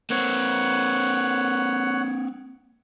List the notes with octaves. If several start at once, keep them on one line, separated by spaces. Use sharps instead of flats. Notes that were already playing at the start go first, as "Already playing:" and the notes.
A#3 C4 C#5 F#5